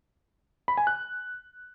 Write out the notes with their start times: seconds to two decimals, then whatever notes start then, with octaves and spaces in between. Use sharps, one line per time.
0.68 B5
0.77 G#5
0.87 F#6